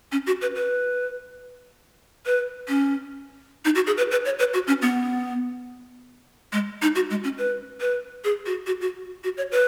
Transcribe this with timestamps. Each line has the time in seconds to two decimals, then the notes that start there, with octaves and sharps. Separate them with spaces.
0.12 C#4
0.27 F#4
0.41 B4
0.55 B4
2.26 B4
2.68 C#4
3.65 D#4
3.75 F#4
3.87 G#4
3.97 B4
4.11 B4
4.25 C#5
4.39 B4
4.54 F#4
4.67 C#4
4.82 B3
6.53 G#3
6.82 D#4
6.95 F#4
7.10 G#3
7.24 C#4
7.38 B4
7.81 B4
8.24 G#4
8.46 F#4
8.67 F#4
8.81 F#4
9.24 F#4
9.37 C#5
9.52 B4